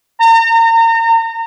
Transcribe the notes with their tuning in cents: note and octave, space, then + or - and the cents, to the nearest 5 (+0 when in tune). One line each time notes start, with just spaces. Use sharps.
A#5 -35